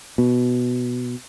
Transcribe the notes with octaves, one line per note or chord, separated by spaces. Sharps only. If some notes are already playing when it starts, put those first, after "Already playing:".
B2